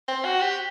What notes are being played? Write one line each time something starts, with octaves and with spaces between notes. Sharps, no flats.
C4
F#4
G4